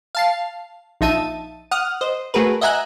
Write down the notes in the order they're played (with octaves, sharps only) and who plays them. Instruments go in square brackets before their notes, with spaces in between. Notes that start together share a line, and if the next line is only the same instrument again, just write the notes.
[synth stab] F5 A5 C7
A#1 F3 D#4 E5 A5 D#7
F#5 D#6 F6
C5 D#5
A3 F#4 G#4 A#4 B4
D#5 E5 F#5 G#5 A#5 F#6